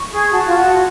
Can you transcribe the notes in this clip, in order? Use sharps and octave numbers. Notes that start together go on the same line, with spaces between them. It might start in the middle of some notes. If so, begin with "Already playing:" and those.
Already playing: C#6
G#4
F#4 A5
F4
F#4